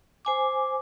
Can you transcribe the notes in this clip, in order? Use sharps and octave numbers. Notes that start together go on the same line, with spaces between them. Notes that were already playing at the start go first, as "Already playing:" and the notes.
C5 G#5 D6